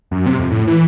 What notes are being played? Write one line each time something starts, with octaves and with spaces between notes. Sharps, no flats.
F#2
C3
F2
A2
E3